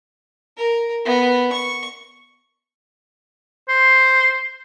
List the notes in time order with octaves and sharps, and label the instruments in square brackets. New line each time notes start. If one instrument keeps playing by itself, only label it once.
[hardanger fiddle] A#4
B3
C#6
[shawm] C5